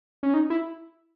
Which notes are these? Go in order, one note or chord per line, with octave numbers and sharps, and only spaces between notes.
C#4
D#4
E4